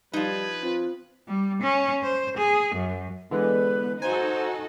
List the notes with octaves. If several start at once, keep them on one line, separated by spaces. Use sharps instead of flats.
F3 G3 D#4 B4 G#6
C4 F4
G3
C#4
C5
G#4
F#2
D3 E3 G#3 B3 B4
D#4 F#4 A4 C5 G#5 A#5